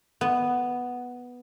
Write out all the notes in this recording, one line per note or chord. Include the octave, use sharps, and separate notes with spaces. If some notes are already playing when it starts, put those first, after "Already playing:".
B3